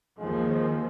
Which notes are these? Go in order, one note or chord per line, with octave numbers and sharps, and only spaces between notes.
D#2 F3 G#3